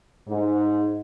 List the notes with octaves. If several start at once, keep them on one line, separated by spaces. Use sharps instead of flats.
G#2